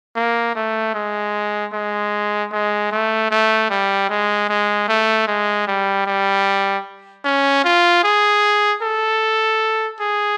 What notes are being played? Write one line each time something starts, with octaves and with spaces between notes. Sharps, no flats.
A#3
A3
G#3
G#3
G#3
A3
A3
G3
G#3
G#3
A3
G#3
G3
G3
C#4
F4
G#4
A4
G#4